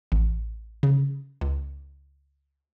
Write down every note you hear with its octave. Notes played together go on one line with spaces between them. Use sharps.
A1
C#3
C#2